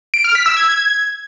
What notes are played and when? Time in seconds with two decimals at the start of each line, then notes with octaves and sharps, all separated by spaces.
0.14 D7
0.24 F6
0.35 B6
0.46 E6
0.57 G#6